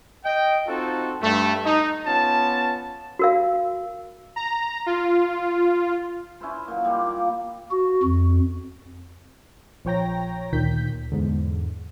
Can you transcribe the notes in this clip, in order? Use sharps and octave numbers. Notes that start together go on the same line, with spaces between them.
D#5 G5
C4 D#4 F4 F#4 A4
G2 A3
D#4
B3 C#4 F4 A5
F#4 A#4 F5
A#5
F4
C#4 E4 B4 C5
A#2 F#3
G3 A#3 D#4 F4
D5 F5 A#5 D6
F#4
F2
A#1 F3 C#5 G5 A#5 A#6
D2 A#2 D#3 G6 B6
E2 G#2 D3